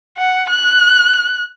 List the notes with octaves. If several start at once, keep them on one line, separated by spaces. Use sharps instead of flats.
F#5
F#6